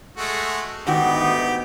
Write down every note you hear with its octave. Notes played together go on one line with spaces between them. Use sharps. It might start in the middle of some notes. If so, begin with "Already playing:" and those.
G#3 A3 F#4
D2 G#2 D#3 B3 D#4 F#4 G4